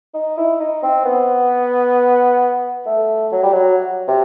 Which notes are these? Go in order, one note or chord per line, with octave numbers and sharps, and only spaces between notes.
D#4
E4
D#4
C4
B3
A3
F#3
G3
F#3
C3